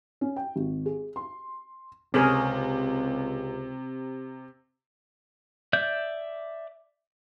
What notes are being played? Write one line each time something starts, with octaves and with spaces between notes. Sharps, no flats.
C#4
G5
G#1
G#4
C6
C#2 C3 C#4 G#4 A#4
D5 E5 G6